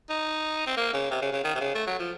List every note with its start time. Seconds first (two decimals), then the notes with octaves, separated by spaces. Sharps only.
0.09 D#4
0.67 C4
0.77 A#3
0.94 C#3
1.11 C3
1.22 C#3
1.33 C#3
1.44 D#3
1.55 C3
1.61 C#3
1.74 A3
1.87 F#3
1.99 F3